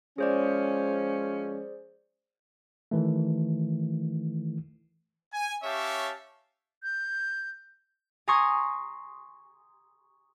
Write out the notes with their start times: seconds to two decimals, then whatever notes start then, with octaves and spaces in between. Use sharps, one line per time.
0.18 F3 G#3 C#4 G#4 C5 D5
2.91 D#3 E3 A3
5.33 G#5
5.63 C#4 G4 C#5 E5 F5 A5
6.83 G6
8.28 G#5 A#5 C6 C#6 D#6 G#6